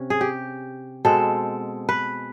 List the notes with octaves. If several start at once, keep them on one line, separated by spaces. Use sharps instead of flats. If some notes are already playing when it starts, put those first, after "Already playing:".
Already playing: C3 C#4
G#4
G4
B2 G#3 C4 A4
B4